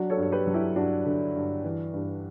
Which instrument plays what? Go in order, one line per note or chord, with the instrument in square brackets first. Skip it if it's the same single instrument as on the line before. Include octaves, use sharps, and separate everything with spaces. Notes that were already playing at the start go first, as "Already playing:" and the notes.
Already playing: [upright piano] F#3 D4 F#4
A4 C#5
G2
C#5
G4 B4
F#3
E4 G4
G2 D4 F#4
D3
G2
E3
G2